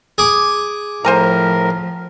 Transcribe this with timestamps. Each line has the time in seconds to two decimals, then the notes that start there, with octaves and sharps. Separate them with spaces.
0.18 G#4 D6
1.05 A2 F3 A#4 C5 G#5 A#5